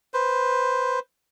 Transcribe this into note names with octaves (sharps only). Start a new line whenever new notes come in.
B4 C5